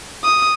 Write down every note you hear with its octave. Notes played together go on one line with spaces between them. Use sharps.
D#6